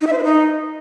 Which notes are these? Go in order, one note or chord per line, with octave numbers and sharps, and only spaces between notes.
D#4
E5
C5
B4
D#4